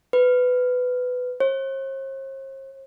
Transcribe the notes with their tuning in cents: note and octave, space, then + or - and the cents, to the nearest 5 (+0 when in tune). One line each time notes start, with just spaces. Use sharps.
B4 +15
C5 +45